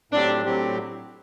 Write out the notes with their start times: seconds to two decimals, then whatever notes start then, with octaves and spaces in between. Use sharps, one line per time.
0.12 A2 F#3 C4 D4 G4
0.45 A2 F#3 C4 G4